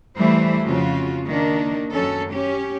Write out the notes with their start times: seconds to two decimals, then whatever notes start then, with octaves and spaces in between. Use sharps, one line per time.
0.16 E3 G3 A3 E4 C5
0.64 F2 C#3 F4 F#4
1.27 D#3 A#3 D4
1.92 F#2 F#3 C#4 A4
2.31 C#4 G4